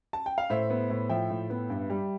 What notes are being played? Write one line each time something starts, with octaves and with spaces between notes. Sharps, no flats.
A5
G5
F5
A2 C5 E5
B3
A2
F3 E5 G5
A2
B3
G2
G3